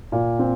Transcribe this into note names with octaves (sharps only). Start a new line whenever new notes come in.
A#2
C4